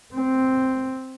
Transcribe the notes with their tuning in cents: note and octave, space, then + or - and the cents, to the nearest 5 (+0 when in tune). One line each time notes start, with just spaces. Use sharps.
C4 +0